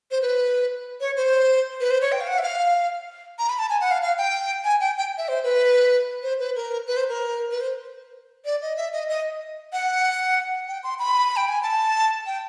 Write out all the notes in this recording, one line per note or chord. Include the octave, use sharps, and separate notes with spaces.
C5
B4
C#5
C5
B4
C5
C#5
G5
F5
F#5
E5
F5
A#5
B5
A5
G#5
F#5
F5
F5
G5
G#5
G5
G5
E5
C5
B4
C5
B4
A#4
B4
C5
A#4
B4
C5
D5
D#5
E5
D#5
D#5
F#5
G5
C6
B5
G5
G#5
A5
G5